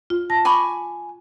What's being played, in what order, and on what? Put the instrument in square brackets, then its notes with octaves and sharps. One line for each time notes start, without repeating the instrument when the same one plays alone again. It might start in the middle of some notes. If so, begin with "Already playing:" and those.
[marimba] F4
A5 A#6
[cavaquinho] G#5 B5 C#6 [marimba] D6